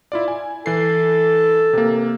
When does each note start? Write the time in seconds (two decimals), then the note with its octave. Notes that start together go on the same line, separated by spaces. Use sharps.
0.12 E4 F4 D5
0.28 G#5
0.66 E3 A4 C7
1.73 C3 A#3